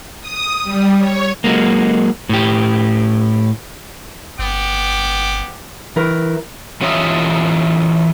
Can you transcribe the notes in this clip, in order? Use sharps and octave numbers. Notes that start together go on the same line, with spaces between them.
D#6
G3
C#5
F#3 G#3 A#3
A2 G4
G1 B3 G5 D6
E3 E4 A#4
E3 C#4 F4 G4 D#5 E5